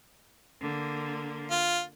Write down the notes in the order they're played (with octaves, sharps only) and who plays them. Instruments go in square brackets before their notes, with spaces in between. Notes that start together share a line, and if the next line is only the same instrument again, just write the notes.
[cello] D3 A#3
[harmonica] F4